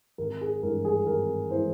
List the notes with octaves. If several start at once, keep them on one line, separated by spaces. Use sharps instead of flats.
G#1 A#4
G#4
G2 E3 G#3 A#4
G#4
G#1 A#4
E3 G#3 C5